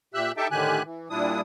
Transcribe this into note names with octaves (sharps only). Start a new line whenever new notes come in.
A#2 G4 E5 E6 F#6
D#4 G4 A4 E5 G5 A5
A2 D3 D#3 G4 G#5 F#6
E3
A#2 G3 D4 E4 D#6